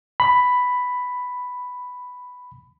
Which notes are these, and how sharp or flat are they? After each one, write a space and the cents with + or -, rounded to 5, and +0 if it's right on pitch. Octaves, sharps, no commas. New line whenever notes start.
B5 +5